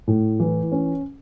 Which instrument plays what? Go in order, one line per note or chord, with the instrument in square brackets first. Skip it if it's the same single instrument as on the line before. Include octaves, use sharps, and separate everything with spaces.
[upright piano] A2
E3
C#4